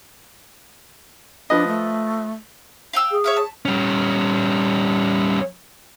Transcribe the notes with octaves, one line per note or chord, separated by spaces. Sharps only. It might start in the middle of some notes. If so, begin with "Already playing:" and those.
F3 D4 B4 D#5
A3
F5 G5 E6
G#4
C#5 E5 F5
A5
G3 C#4